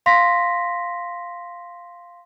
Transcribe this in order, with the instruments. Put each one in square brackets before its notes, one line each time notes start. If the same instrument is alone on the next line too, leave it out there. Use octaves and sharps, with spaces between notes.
[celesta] F5 C6 A#6 B6